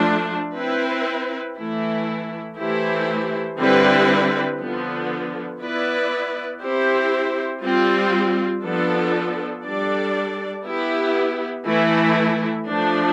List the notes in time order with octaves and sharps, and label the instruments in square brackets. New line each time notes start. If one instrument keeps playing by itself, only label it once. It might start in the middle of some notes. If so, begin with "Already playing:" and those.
Already playing: [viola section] F3 A3 D4
C4 E4 B4
E3 A3 E4
E3 A3 E4 G4 C5
D3 G3 C4 E4 B4
D3 F3 B3
B3 E4 B4 D5
C4 E4 G4 C5
G3 C4 F4
F3 B3 D4 A4
G3 D4 A4 D5
B3 E4 G4
E3 A3 E4
F3 A3 D4